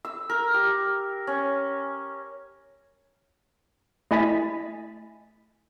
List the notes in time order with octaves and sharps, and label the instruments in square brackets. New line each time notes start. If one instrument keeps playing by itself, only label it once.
[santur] E6
A#4
G4
C#4
[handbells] A3 E4 D#5 G#5 A6 B6